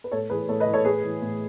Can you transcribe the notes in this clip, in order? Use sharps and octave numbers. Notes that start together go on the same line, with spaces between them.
B4
A2 A4 C#5
E3 G#4 B4
A2 A4 C#5
B4 D#5
E3
A4 C#5
A2 G#4 B4
E3
A2